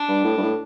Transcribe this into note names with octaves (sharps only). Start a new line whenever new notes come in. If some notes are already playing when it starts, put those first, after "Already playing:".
Already playing: D4
G2
A2
G2
A2